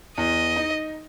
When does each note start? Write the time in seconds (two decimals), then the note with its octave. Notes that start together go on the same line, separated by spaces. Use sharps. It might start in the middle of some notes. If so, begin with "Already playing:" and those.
0.18 E2 D#5
0.56 D#4